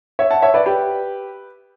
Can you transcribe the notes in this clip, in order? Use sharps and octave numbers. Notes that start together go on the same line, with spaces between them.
C#5 E5
F#5 A5
C#5 E5
B4 D5
G4 B4